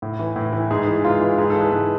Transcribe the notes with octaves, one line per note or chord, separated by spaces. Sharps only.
A2
E3
A2
E3
G#2 G#4
E3
G#2 F4
E3
G#2 G#4
A4
E3
B4
G#2